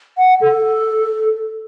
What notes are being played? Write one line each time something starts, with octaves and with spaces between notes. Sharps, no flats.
F#5
A4